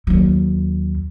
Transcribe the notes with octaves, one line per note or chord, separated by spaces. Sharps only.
D#2 F#3